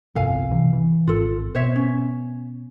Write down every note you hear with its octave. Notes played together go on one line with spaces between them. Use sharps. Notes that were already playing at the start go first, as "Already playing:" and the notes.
G1 C2 F2 A4 F5 G#5
B1 C3 E3
E3
G#1 F4 A4
B2 C5 C#5 E5
C#4